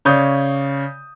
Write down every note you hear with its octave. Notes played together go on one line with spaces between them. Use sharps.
C#3 C#5 D5 D#6 G6